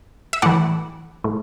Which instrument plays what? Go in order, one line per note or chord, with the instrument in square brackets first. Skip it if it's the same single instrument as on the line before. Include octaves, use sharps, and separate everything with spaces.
[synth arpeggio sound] E5
A2 E3 D5 F#5
A2